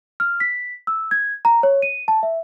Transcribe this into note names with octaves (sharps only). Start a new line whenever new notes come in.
F6
B6
E6
G#6
A#5
C#5
D#7
A5
E5